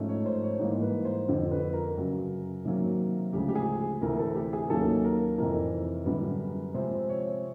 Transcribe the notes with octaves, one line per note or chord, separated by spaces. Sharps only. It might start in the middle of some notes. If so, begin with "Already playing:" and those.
Already playing: G#2 F3 A3 C#4
C#5
C5
C#5
G#2 E3 G3 A#3
B4
C5
F2 D3 F3
B4
A#4
F#2 C#3 F#3
C3 D#3 F#3 A#3 C#4
D2 C#3 F3 G#3 G4
G4
G#4
D2 C3 E3 A3 A#4
A4
G4
G#4
D#2 D#3 F#3 A#3 C#4 A4
A#4
F2 C3 E3 A#4
F#2 D3 G3 B3
C3 F3 G#3 C4 C5
C#5